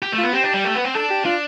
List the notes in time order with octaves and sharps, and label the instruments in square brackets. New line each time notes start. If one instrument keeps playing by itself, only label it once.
[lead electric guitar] G4
A3
[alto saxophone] F4
[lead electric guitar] B3
[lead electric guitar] C4 [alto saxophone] G4
[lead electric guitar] D4
G3
A3
B3
C4
[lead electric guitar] D4 [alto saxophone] A4
[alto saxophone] G4
[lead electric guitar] D4 [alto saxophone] F4